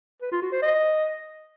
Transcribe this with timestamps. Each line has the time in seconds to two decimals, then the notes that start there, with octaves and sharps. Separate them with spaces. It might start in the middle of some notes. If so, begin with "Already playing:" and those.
0.22 B4
0.32 F4
0.42 F#4
0.52 C5
0.62 D#5